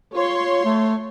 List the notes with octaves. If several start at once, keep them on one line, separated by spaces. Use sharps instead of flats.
F4 C#5 C6
A3